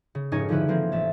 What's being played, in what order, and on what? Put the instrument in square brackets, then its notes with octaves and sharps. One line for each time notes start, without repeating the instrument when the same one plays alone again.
[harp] C#3
F1 G#2 C#4 D#4 C#5 G#5
D3 F3 C#4 E4 B4
E3 F3 A#3 C4
A1 E5 A6